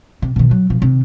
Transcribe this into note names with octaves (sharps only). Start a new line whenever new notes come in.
C3
B2 D#3
F#3
B2 F3
C3 D#3